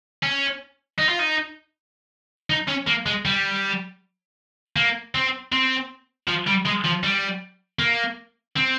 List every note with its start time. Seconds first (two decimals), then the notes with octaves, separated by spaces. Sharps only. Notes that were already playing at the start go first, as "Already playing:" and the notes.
0.23 C#4
0.99 D#4
1.09 F4
1.19 D#4
2.50 D#4
2.68 C#4
2.87 A#3
3.06 G#3
3.25 G3
4.76 A#3
5.15 C4
5.52 C4
6.28 F3
6.47 G3
6.66 G#3
6.85 F3
7.04 G3
7.79 A#3
8.56 C4